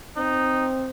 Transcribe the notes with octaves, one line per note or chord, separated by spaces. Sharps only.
C4 D#4